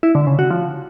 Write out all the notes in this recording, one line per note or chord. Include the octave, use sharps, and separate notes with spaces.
E4
D3
C#3
F#4
F3